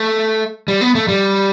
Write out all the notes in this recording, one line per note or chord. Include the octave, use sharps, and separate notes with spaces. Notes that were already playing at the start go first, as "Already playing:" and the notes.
Already playing: A3
G3
B3
A3
G3